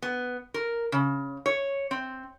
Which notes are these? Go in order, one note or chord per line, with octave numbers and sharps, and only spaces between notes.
B3
A#4
C#3
C#5
C4